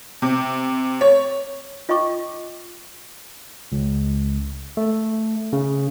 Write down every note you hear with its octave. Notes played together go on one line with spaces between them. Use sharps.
C3
C#5
F4 D#5 G5 C#6 D6
C#2
A3
C#3